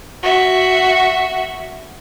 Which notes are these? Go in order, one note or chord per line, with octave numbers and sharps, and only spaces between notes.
F#4 E5